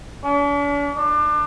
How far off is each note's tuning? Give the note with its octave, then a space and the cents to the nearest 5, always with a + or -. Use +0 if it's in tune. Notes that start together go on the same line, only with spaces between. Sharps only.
D4 -45
D4 +30